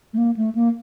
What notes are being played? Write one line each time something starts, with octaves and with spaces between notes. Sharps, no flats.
A3
A#3
A3
A#3